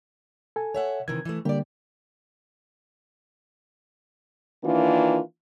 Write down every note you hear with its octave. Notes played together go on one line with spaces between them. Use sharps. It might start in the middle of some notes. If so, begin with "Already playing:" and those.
A4 G#5
C#5 E5 F#5
C3 D#3 E3 G#6
E3 A3
D3 G3 A#3 G4 D5
D#3 E3 A#3 D4 F4